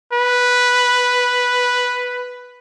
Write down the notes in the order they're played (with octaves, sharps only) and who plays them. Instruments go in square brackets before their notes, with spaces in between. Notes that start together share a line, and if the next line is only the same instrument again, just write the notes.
[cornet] B4